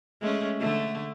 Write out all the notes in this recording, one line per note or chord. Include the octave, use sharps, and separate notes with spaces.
G#3 A3 C#4
D3 A3